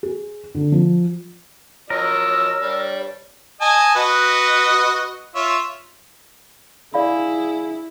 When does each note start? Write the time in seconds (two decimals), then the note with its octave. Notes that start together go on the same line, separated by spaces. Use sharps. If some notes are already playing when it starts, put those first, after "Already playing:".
0.03 G#4
0.55 D3
0.72 F3
1.90 F3 F#3 A#4 C#5 D#5 E6
2.61 G3 D4
3.61 D#5 G#5 A5
3.96 F#4 B4 D#5
5.35 F4 C#5 E5
6.94 E4 G#4 D5 F5 B5